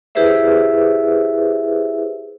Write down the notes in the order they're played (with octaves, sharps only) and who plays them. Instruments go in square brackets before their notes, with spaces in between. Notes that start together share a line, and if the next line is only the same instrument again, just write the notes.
[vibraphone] E4 G4 G#4 B4 C5 E5